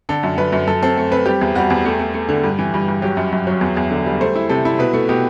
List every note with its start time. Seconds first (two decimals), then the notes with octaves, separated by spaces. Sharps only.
0.09 D3 A4
0.23 F#2
0.38 F#2 B4
0.52 F#2
0.67 F#2 A4
0.83 C4 A4
0.97 A3
1.12 C4 B4
1.26 G3 G4
1.41 E2
1.55 G3 F#4
1.70 E2
1.85 A3 G4
1.99 A3
2.14 A3
2.29 D3
2.44 G2
2.59 E3
2.74 G2
2.88 G2
3.02 F#3 G4
3.17 F#2
3.32 F#2
3.47 F#3
3.61 E2
3.77 E2
3.90 D3
4.06 G3
4.21 A3 C5
4.36 E4
4.49 C3 A4
4.65 E4
4.79 B2 B4
4.93 A3
5.09 B2 G4